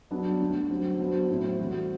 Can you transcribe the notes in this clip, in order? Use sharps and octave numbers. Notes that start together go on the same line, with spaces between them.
G2 F#3 B3 D4
G2 D3 A3
G2 F#3 C4
F#3 B3 D4 F#4 C5
A2 F#3 C4 E4
E3 G3 C4 F#4